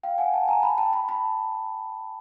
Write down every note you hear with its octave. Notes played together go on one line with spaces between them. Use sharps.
F5 G5
F#5 G#5
G5 A5
G#5 A#5
A5 B5
G5 A5
A5 B5
A5 B5